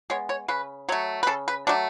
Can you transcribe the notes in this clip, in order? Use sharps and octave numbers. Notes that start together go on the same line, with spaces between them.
G#3 B3 C#5
C#5
C#3 B4
F#3 A3 C#5
B4
C#3 A4
B4
F#3 A3 D4